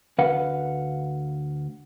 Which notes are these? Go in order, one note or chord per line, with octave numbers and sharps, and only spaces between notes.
D2 B4 F5 F#5